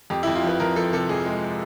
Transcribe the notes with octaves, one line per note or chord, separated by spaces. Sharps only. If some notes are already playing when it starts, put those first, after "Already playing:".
F2 G4
F2 E4
F4
F3 B4
F2 A#4
F3 A4
C3 A4
F2 G#4
G#3